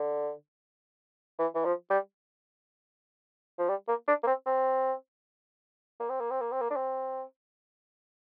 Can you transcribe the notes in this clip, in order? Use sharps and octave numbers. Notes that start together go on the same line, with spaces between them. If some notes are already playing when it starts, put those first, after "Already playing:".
Already playing: D3
E3
E3
F3
G3
F3
G3
A#3
D4
A#3
C4
C4
A#3
C4
A#3
C4
A#3
C4
A#3
D4
C4